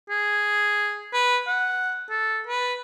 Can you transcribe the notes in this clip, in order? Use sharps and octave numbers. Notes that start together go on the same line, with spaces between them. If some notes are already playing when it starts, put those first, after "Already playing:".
G#4
B4
F#5
A4
B4